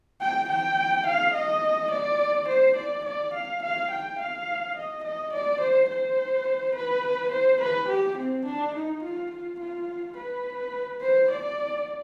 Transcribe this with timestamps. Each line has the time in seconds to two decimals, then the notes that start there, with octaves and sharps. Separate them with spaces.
0.21 G5
0.49 G5
1.06 F5
1.34 D#5
1.91 D5
2.48 C5
2.76 D5
3.05 D5
3.34 F5
3.63 F5
3.91 G5
4.19 F5
4.77 D#5
5.04 D#5
5.33 D5
5.61 C5
5.89 C5
6.75 B4
7.32 C5
7.61 B4
7.89 G4
8.18 C4
8.45 D4
8.74 D#4
9.03 F4
9.31 F4
9.60 F4
10.17 B4
11.01 C5
11.31 D5